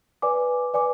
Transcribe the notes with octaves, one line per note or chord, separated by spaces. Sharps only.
B4 D5 G#5 D6
B4 D5 G#5 D6